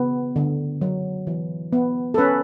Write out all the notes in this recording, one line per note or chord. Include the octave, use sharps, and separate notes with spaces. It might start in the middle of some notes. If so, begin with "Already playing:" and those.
Already playing: C#3 B3
D3
F#3
E3
B3
A4
C#4 B4